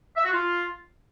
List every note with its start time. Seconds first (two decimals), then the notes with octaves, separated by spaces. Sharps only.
0.16 E5
0.24 F#4
0.32 F4